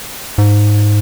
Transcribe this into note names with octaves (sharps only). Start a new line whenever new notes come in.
G#2